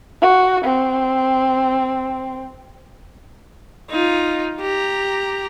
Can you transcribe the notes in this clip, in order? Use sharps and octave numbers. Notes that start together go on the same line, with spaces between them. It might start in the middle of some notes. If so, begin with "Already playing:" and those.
F#4
C4
D#4 F4
G4 A#5